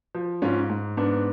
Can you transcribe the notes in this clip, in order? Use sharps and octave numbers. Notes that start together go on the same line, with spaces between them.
F3
G#2 C#4 F4
G#2
G#2 B3 D4